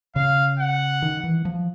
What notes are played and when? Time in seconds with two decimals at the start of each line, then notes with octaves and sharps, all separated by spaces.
0.16 C#3 F5
0.59 F#5
1.02 D#3
1.24 E3
1.45 F3